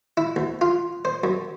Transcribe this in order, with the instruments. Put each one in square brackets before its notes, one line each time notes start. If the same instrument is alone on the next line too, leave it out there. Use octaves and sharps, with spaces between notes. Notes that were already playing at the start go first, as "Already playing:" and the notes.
[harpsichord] E4
D2
F4
C5
F#2